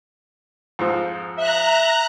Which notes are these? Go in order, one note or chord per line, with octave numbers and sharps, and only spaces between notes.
F2 G#2 F3
E5 A#5 F#6